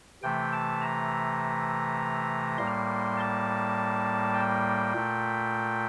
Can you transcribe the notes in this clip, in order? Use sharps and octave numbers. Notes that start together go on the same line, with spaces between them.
C3 E3 A3 G5
A5
A#5
A2 G3 A#3 C6
A5
G5
A#2 A3